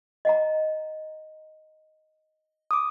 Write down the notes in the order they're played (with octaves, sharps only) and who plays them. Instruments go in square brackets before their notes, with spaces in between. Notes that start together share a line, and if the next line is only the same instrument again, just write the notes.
[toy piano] D#5 F#5 A#5
[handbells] D6 D#6